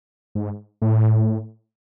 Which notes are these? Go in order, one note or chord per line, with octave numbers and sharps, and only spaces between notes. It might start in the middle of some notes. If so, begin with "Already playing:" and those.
G#2
A2